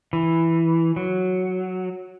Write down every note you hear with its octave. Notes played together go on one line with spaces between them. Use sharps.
E3
F#3